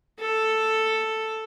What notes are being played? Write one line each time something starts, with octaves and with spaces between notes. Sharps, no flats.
A4